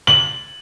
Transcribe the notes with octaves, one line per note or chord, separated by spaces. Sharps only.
F#7